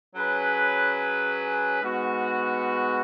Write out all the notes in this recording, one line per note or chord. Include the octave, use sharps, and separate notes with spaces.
F#3 C#4 G#4 B4
G#2 G#3 B3 F#4